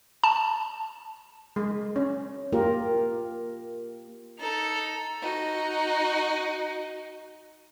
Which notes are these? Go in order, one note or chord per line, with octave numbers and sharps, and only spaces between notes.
A5
G#3
C#4
A#3 F4 G4 A#4
D#4 A4
D#4 F#4